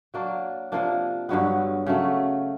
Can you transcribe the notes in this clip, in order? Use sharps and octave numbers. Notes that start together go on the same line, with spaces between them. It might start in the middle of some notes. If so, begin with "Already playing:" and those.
F#3 A#3 D4
C3 F3 A#3 D4
G2 D3 F#3 B3
C#3 F#3 A3